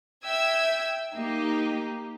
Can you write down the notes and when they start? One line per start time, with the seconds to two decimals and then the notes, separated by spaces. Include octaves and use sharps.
0.25 E5 G5 E6 G#6
1.13 A#3 D#4 G4